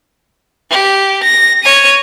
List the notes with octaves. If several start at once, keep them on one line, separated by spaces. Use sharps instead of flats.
G4
A#6
C#5 D#7